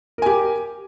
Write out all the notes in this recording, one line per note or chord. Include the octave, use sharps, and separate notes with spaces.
G4 A#4 G#5